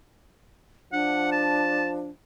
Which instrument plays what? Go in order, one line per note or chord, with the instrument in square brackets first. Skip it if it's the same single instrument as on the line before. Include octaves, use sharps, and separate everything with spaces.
[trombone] F3 [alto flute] D4 [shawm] F#5
[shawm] A5